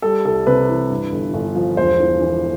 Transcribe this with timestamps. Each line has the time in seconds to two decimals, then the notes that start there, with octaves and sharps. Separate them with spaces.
0.02 G3 A4
0.25 C2 A4
0.47 C3 B4
0.69 E3
0.90 G2
1.12 G1
1.34 G1
1.55 F3
1.77 E1 C5
2.00 E3
2.21 E3